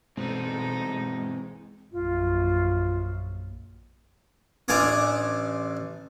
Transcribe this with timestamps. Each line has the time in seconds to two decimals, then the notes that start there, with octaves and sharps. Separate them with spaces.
0.17 B2 E3 G#3 C4 D#4 A4
1.92 A#1 F#2 F4
4.68 A1 D4 F5 G#5 D#6